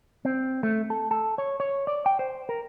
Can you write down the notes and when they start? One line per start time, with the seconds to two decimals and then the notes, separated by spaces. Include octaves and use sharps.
0.25 C4
0.63 A3
0.90 A4
1.11 A4
1.38 C#5
1.60 C#5
1.87 D5
2.06 G5
2.19 C5
2.49 A#4